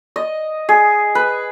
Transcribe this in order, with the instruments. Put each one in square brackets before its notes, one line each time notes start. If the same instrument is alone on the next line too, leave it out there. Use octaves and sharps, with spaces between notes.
[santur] D#5
G#4
B4